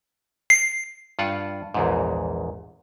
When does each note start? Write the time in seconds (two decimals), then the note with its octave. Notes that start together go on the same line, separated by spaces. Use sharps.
0.50 C7
1.19 G2 F4 F#5
1.74 A#1 E2 G#2